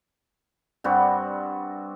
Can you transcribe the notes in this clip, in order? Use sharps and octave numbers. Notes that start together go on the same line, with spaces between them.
G2 G3 C4 F#4